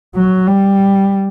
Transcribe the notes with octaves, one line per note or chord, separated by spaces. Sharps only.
F#3
G3